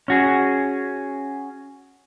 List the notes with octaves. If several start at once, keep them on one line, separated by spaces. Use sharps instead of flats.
C#4 F#4 G#4